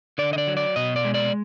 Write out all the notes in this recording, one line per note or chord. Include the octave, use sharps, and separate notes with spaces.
D3 D5
D#5
D5
F#3
D5
B2 D#5
D5
G#3
D5